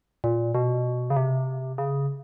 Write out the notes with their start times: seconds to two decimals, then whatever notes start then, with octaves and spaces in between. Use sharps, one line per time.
0.24 A#2
0.55 B2
1.10 C#3
1.16 C3
1.78 C#3